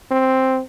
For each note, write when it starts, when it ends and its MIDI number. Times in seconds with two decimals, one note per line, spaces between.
0.11 0.61 60